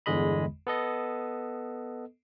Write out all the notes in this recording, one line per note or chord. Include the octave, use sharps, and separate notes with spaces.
G1 E2 D3 G#3 D#5 B5
B3 A4 D#5